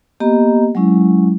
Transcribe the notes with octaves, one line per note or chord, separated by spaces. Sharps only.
A#3 B3 G4 D#5 A#5
F#3 G#3 C#4 E4